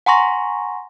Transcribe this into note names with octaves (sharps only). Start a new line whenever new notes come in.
F#5 G#5 A#5 C6 C#6 A#6